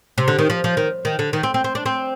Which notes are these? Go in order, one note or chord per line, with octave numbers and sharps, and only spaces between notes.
C3
D3
D#3
F3
F3
D#3
D#3
D3
D#3
C4
C4
C4
D4
C4